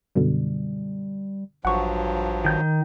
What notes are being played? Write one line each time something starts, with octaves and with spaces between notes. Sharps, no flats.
F#2 B2 D3 G3
A1 G2 F3 F#3 F#5 C#6
D#3 G6